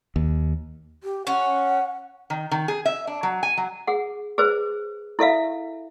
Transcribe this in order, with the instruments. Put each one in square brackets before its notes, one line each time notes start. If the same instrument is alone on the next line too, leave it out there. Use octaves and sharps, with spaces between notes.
[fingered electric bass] D#2
[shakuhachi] G4
[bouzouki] C#4 [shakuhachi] F#5
[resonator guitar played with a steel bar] D#3
D#3
G#4
E5
D4
F#3
G#5
F#3
[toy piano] G#4 F#5
G#4 B4 C5
E4 A4 E5 F5